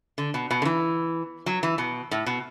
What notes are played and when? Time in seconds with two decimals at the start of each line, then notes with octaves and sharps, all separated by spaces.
0.18 D3
0.34 B2
0.51 B2
0.62 D3
0.65 E3
1.46 F#3
1.63 E3
1.78 B2
2.11 A2
2.26 B2